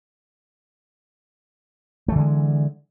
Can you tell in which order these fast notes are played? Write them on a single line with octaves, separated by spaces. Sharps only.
A3 E3 D3 G#3